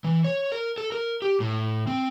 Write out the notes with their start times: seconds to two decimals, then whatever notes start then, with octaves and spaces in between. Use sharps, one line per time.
0.04 E3
0.24 C#5
0.52 A#4
0.78 A4
0.92 A#4
1.22 G4
1.40 A2
1.87 C4